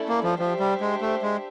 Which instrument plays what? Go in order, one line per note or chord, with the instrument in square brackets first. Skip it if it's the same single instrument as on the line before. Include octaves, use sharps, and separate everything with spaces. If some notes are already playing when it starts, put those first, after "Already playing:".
Already playing: [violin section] A3 C#4 E4 A4 D5
[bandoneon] A#3
F3
[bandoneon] F3 [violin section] D4 G4 C5 E5
[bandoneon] G3
G#3
A3
G#3